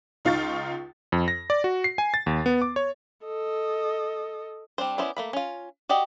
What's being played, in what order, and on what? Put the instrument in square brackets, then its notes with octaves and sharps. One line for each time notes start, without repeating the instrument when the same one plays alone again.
[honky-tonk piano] C#2 D#4 F4 F5 C#6 A6
[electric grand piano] F2
A#6
D5
F#4
C7
G#5
A6
D#2
B3
D6
C#5
[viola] A4 D#5
[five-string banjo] G3 C4 D4 C5
B3 C#4 E4 C5 D5
A3 A#3 B5
C#4 F4
F#4 G4 D5 D#5